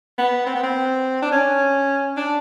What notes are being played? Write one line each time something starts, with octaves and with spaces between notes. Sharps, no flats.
B3
C4
B3
C4
D4
C#4
D4